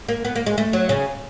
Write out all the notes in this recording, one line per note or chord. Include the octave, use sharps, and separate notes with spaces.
A#3
B3
A#3
G#3
A3
F#3
C#3